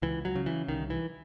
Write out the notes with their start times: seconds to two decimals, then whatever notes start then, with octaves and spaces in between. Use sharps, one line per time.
0.02 C#2 E3
0.25 F#3
0.35 C#3
0.46 E3
0.68 C2 D#3
0.90 E3